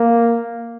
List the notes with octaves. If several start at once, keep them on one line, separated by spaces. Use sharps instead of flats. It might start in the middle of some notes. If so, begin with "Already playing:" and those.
Already playing: A#3